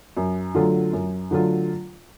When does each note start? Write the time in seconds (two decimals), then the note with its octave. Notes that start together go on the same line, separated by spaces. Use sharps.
0.17 F#2
0.55 D3 F#3 A3 F4
0.93 F#2
1.31 D3 F#3 A3 F4